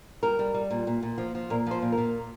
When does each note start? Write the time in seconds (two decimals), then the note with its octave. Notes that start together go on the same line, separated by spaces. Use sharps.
0.23 G3 A#4
0.39 G3
0.54 G3
0.71 A#2
0.87 A#2
1.03 A#2
1.18 F3
1.35 F3
1.50 A#2 A#4
1.67 F3 C5
1.82 A#2
1.92 A#4
1.98 A#2